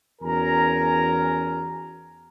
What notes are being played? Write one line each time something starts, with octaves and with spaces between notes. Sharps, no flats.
E2 C#4 F#4 A#4 G#5 A#5